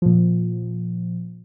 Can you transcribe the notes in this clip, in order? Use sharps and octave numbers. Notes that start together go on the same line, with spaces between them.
A#2 F3